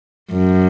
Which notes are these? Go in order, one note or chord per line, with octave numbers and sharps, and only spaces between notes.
F#2